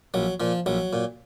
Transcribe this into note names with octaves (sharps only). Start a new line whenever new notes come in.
A#1 F#3
A#2 F3
A#1 F#3
A#2